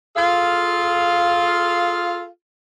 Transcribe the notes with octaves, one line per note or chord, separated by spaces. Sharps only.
F4 G#4 A4 F5